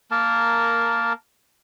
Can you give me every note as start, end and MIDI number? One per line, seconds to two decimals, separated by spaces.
0.11 1.13 58
0.11 1.13 70
0.11 1.13 81